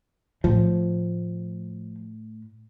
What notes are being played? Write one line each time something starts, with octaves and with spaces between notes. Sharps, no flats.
A2 F3